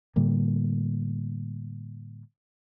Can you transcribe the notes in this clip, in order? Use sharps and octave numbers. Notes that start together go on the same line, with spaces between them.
A2 D3 G3 A#3